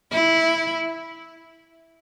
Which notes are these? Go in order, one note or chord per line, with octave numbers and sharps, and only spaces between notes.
E4